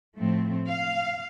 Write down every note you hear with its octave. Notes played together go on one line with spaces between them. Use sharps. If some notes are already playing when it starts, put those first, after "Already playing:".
A2 F3 A3 C4
F5